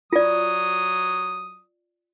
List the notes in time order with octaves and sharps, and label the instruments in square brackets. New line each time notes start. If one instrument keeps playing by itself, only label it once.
[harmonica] F#3 D#6 [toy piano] F4 D5